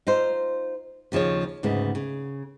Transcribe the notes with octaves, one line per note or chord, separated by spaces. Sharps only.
D#4 F4 C5
D#2 C#3 F3 G#4 C#5
D2 G#2 C#3 B3
C#3